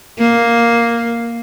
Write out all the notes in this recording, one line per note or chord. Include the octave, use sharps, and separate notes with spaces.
A#3